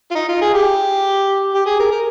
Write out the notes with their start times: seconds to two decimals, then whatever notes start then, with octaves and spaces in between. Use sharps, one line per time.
0.11 F4
0.15 D#4
0.29 F4
0.41 G#4
0.54 G4
1.54 G4
1.66 G#4
1.79 A#4
1.91 A#4